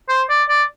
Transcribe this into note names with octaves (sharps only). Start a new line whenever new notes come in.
C5
D5
D5